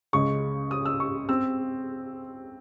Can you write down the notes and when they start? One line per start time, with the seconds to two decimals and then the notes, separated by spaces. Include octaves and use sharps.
0.13 C#2 C#3 G#3 C#6
0.71 D#6
0.85 E6
1.00 C#6
1.29 C4 E6